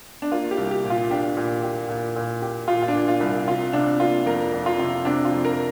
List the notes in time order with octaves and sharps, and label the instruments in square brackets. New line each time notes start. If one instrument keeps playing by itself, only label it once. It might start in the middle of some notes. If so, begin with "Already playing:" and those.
[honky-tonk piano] D4
[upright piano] A#3 [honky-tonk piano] F4
[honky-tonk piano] G4
[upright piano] C2
[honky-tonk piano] G4
[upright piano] A#2
[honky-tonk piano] F4
[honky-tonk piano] D4 [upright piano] G4
[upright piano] A#2
G4
A#2
A#2
G4
[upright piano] A#2 [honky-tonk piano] F4
[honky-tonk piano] F4
D4
[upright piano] A#2
[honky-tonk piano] F4
[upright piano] C2
[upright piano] C3 [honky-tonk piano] F4
[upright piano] C3 [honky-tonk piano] D4
[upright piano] A#3 [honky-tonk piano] F4
[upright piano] F2 [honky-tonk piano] A#4
[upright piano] F2
[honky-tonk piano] F4
[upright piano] C3
[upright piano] C3 [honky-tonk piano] D4
[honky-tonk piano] F4
[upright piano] F2
[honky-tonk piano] A#4